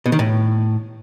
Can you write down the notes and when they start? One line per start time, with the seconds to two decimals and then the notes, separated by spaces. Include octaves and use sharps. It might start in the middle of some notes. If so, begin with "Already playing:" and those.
0.06 B2
0.12 D#3
0.19 A2